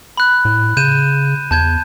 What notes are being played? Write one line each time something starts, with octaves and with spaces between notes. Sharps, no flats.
B5 F#6
A2
C#3 G6 D#7 E7
E2 A5 G6 G#6